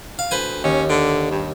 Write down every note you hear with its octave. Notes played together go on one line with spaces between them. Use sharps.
F5
D2 B4 C5 G#5
D#2 C#4
D3
G2